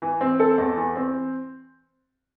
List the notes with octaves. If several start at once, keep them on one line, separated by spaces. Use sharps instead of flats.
E3
C4
A4
E2
E3
C4